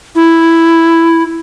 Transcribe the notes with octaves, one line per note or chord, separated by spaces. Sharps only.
E4